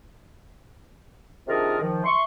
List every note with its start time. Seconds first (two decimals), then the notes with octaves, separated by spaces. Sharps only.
1.48 C3 D#3 D4 F4 G#4 A#4
1.80 D#3 F3
2.04 E5 C6 C#6